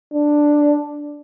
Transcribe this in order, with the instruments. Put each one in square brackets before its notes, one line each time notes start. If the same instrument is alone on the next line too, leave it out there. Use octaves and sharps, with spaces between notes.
[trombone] D4